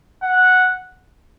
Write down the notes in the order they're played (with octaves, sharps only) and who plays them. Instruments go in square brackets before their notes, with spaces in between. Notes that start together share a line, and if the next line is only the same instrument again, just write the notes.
[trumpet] F#5